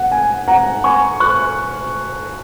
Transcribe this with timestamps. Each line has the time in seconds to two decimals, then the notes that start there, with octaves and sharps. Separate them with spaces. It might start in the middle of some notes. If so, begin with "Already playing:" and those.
Already playing: F#5
0.11 G#5
0.48 F#5 A#5
0.84 G#5 C#6
1.20 C#6 F#6